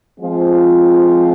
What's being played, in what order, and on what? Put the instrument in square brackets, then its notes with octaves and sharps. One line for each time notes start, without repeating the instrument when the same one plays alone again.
[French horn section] F3 G#3 C4 F4